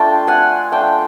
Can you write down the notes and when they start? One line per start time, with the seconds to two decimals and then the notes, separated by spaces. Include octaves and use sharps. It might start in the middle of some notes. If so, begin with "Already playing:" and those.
Already playing: A3 D4 F4 G5 A5
0.27 F#5 G#5
0.72 A3 D4 F4 G5 A5